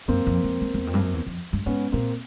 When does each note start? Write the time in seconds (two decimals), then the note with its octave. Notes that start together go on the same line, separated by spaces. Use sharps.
0.08 F#2 A#3 C4
0.27 F2
0.44 F2
0.61 E2
0.74 E2
0.87 F2
0.94 G2
1.01 F#2
1.13 E2
1.26 F2
1.53 G2
1.66 G#2 B3 C#4
1.92 A#2 A#3 C4